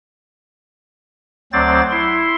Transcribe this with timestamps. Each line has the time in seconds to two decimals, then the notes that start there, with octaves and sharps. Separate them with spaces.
1.53 D2 F#3 C4 C5 D5 A6
1.91 E4 C6